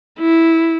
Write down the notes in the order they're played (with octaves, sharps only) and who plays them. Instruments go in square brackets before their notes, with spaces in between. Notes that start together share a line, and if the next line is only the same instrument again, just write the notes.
[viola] E4